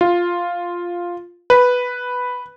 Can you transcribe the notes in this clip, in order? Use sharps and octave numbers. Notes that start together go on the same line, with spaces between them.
F4
B4